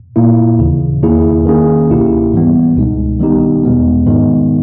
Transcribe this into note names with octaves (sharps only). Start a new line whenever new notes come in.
A#2 A#3 E4
D#2 C#3 E3
E2 D#3 A#3 E4 G#4
D#3 A#3 C#4 G#4
C#2 B2 A#3 E4 G4
G#2 E3 G3 B3
C#2 B2 G#3 D#4
D#3 G3 B3 D#4 G4
E2 B2 G#3 B3
G#2 D#3 G#3 B3 D#4